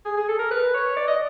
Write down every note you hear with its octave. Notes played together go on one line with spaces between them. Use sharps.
G#4
G#4
A4
A#4
B4
C#5
D5
D#5